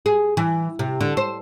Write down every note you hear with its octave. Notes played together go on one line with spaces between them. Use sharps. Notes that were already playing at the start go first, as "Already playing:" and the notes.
G#4
E3
C3
D3
C5